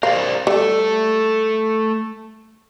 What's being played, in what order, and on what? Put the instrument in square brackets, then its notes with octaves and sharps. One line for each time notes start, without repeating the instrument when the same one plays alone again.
[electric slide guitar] A#4 C5 D5 [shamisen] F5
[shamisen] G3 [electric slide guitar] A3 A4